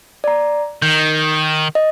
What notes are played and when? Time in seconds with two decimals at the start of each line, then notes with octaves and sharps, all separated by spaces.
0.24 D5 A#5
0.82 D#3 G6
1.75 D#5